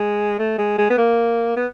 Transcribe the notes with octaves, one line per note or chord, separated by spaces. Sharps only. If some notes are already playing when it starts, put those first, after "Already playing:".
Already playing: G#3
A3
G#3
G#3
B3
A#3
B3